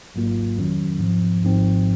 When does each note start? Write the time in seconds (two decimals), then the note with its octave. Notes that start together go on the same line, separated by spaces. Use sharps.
0.15 G#1 G#2 F#3 A#3 F4
0.57 F2 D#3 F#3 C#4
0.99 G#2 F3 C4
1.43 G#1 G#2 F3 C4